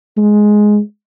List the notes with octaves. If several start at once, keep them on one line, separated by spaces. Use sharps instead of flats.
G#3